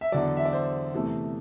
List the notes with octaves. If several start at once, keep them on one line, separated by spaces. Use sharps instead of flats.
E5
E2 D3 F#3 D5
E5
D5
C5
E2 C3 E3 A3